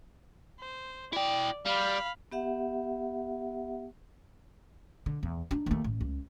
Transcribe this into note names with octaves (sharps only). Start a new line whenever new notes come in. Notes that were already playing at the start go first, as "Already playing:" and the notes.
C5
E4 D5 G5
G3 F5 B5
B3 G4 E5 F#5
D3
E2
D4 D#4
D#2 A3
A1
C#2